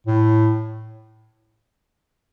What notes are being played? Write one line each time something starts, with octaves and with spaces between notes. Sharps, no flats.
A2